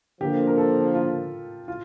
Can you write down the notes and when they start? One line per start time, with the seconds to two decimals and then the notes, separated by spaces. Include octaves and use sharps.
0.21 D3 F3 A#3 G4
0.47 A#4
0.58 A4
0.95 F4
1.68 F4